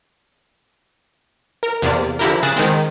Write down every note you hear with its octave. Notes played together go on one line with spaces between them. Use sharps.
A#4
E2 C3 A#3 D5
D3 F3 E4 G4 A#4
C#3 G#4 F#6 A6 A#6 E7
D#3 G#3 C4